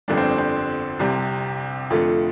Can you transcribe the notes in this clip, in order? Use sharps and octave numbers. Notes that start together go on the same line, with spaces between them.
G1 F2 D3 G3 D4
C4
C4
C2 C3 G3
F2 D3 A3 F4